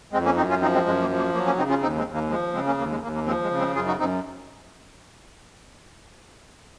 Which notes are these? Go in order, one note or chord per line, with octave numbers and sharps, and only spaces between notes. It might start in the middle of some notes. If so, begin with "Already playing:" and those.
F2 G#3 C4
A#3 C#4
F#2 C4 D#4
C#4 F4
F3 C4 D#4
G#3 C4
F#2 G#3
A#3
F3
A#3
F#3 A#3
A#3 C#4
C#3 C4 D#4
C#4 F4
D#2 C4 D#4
G#3 C4
D#2
A#3
F3 G#3
C#3 G#3 C4
A#3 C#4
D#2 A#3
G#3
D#2 A#3
A#3
F3 G#3 C4
G#3
C#3
G#3 C4
F#2 F4 G#4
D#4 F#4
F#2 C4 D#4